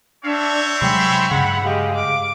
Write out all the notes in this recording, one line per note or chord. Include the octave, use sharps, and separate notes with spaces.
C4 D4 C#5 E5
C3 F#3 G#3 G5 B5 C6
G2 C#3 F#5 B5
G#3 G4 F5
D6